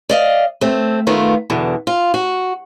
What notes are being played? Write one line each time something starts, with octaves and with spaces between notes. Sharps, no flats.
D5 D#5 F5
A3 C4
D#3 A3 B3 F4
E2 B2 D3
F4
F#4